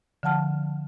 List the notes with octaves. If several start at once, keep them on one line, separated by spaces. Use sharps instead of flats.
D3 F3 F#5 A5 F6